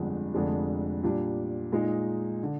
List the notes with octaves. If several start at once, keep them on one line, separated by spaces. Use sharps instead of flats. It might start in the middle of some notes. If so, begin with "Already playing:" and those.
Already playing: G1 F2 D3 G#3 D4
F1 F2 D3 G#3 D4
A#2 G3 D4
A#2 G#3 D#4
D3